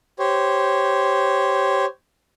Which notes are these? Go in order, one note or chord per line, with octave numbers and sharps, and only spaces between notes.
G4 C5 C#5